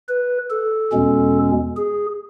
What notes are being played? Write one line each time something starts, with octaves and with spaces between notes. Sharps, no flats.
B4
A4
E2 B2 G#3 C#4
G#4